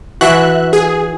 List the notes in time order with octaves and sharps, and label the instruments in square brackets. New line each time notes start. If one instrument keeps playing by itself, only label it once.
[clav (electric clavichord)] E3 F#4 [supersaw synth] E5 F#6
[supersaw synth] G#4